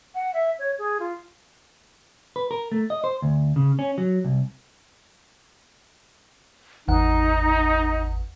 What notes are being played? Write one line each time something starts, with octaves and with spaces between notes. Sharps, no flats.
F#5
E5
C#5
G#4
F4
B4
A#4
A3
D#5
C5
D2
C#3
C#4
F#3
C2
G#1 E2 D#4 F#5